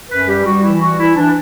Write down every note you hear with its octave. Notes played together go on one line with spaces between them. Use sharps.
F#2 B4
G3 G4
G3 F#4
E3 E4
G3 F#4
E3 E4
E3 D4